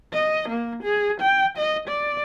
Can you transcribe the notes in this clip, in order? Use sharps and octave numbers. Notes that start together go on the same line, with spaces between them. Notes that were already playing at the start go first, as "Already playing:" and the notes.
D#5
A#3
G#4
G5
D#5
D5